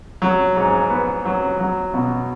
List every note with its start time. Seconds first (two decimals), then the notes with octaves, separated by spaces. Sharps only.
0.22 F#3
0.56 G#2
0.90 B3
1.25 F#3
1.60 F#3
1.94 B2